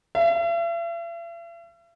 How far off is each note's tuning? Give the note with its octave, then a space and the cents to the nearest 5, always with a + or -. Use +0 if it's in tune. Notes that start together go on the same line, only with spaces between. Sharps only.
E5 +45